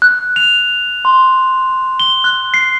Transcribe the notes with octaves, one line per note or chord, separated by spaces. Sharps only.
F#6
F7
C6
G7
F#6
C7